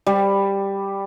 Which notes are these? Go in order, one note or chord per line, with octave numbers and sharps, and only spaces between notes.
G3